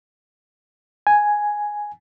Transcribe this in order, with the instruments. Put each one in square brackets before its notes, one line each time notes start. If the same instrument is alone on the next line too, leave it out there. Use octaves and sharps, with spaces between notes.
[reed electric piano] G#5